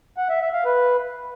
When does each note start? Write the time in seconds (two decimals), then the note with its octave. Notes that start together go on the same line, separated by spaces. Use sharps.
0.17 F#5
0.29 E5
0.41 E5
0.53 F5
0.65 B4